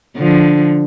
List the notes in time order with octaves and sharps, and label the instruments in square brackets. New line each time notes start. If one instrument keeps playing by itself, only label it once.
[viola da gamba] D3 F3